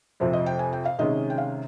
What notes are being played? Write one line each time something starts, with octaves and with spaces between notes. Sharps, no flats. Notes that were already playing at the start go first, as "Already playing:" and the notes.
F2 C3 F3 C4
D#5
G5
G#5
G5
F5
C3 D#3 G#3 C#4 D#5
G5
F5